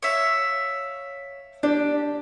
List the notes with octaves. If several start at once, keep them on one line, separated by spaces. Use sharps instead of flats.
C#5 E5 F5
D4 G4